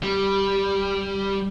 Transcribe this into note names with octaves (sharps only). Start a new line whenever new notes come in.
G3